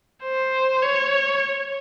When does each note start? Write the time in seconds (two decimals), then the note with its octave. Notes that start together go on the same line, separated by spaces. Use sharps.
0.24 C5
0.83 C#5